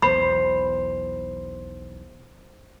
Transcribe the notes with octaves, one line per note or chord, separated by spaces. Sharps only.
B1 E2 C5 B5